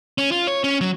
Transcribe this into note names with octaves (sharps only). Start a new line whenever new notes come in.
C#4
F4
C#5
C#4
F#3